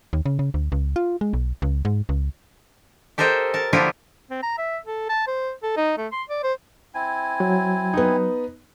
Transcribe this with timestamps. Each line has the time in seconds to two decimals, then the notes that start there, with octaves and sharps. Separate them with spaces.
0.13 D#2
0.26 C#3
0.39 C#3
0.54 D2
0.72 C#2
0.96 F4
1.21 G#3
1.33 B1
1.62 C#2
1.85 G#2
2.09 C#2
3.18 G4 A4 A#4 C5 D#5 G5
3.54 A#4 A5
3.73 D3 F3 A#3 E4 F4 G4
4.30 C4
4.43 A#5
4.58 E5
4.85 A4
5.09 A5
5.27 C5
5.63 A4
5.77 D#4
5.98 A3
6.12 C6
6.29 D5
6.44 C5
6.95 C4 E4 G#5
7.40 F#3
7.94 B3 D#4